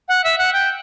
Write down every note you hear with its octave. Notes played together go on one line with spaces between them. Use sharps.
F#5
E5
F#5
G5